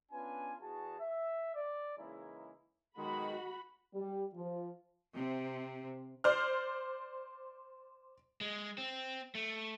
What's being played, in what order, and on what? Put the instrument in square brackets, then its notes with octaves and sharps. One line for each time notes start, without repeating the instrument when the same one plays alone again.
[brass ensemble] B3 C#4 D4 F4 B4 G#5
E2 F#4 G#4 A5
E5
D5
C#3 E3 G#3 A#3 D#4 E4
[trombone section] B1 D#3 G#3 [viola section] F#4 B5
[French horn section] G3
F3
[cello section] C3
[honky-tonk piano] C5 D5 F6
[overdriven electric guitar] G#3
C4
A3